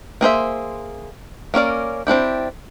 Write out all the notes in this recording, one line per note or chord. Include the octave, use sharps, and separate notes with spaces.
A#3 G#4 C5 E5
A#3 C#4 A#4 D5
C4 D4 E4 G4